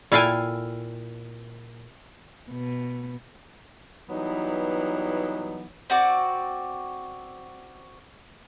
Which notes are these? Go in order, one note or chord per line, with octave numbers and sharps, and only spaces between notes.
A#2 E4 A4 F5 G5 G#5
B2
E3 F#3 G3 B3 D#4
C4 F#4 D5